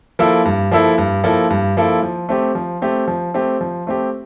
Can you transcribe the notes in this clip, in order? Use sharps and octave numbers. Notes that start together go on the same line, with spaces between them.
F3 A#3 E4 A4
G2
F3 A#3 E4 A4
G2
F3 A#3 E4 A4
G2
F3 A#3 E4 A4
F3
A3 C4 G4
F3
A3 C4 G4
F3
A3 C4 G4
F3
A3 C4 G4